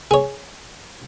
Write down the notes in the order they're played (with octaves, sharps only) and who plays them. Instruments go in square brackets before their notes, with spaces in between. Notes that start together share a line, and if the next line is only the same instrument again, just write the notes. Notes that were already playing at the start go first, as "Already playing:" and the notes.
[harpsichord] G#4 C#5